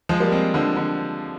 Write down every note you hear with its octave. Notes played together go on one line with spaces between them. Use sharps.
F3 G#3
G3 A#3
G#3 C4
D3 F3
D3